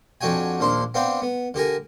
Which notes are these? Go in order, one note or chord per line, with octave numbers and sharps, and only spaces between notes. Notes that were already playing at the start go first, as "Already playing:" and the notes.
F2 D4 F#4 G5 G#5
A#1 D#2 D4 C5 C6
B3 C4 D4 F5 G5
B3
D3 G4 A#4 G#5